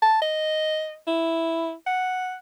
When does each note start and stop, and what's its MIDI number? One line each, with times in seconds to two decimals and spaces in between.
0.02 0.21 81
0.22 0.97 75
1.07 1.72 64
1.86 2.35 78